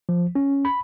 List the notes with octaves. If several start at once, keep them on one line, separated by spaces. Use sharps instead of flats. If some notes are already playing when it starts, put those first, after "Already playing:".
F3
C#4
B5